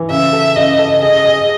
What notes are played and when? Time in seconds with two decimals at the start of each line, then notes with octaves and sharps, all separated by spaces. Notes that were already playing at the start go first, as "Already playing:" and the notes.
Already playing: E3
0.10 C#3 E5
0.33 A4
0.56 C#3 D#5
0.79 A4
1.02 G#4 D#5
1.25 G#4